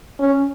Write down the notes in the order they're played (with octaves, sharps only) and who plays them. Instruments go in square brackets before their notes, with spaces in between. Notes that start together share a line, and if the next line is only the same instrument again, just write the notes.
[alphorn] C#4